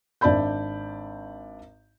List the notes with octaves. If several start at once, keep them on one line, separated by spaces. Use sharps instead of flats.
G#1 D4 D5 E5 B5 G6